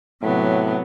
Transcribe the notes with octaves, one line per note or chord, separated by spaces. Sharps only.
A2 C3 F#3 B3